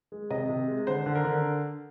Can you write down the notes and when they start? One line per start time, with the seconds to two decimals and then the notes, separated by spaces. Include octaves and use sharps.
0.12 G#3
0.30 C3 D#5
0.49 C3
0.68 G#3
0.87 D3 C5
1.06 D3
1.15 A#4
1.25 D3